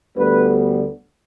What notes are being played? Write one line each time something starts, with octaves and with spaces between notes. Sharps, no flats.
D2 D3 G3 B3 B4